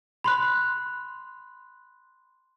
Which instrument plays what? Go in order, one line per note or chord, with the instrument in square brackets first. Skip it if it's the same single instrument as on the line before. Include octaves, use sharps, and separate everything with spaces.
[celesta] B5 C6 F#6